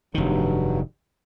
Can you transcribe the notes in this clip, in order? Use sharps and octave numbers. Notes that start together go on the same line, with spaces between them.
F1 G2 D#3 F#3